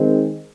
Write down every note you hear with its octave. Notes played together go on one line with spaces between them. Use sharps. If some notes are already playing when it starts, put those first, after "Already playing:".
Already playing: D#3 G#3 C4